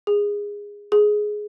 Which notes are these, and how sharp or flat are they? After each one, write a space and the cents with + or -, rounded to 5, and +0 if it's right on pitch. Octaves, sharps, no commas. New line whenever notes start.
G#4 -15
G#4 +10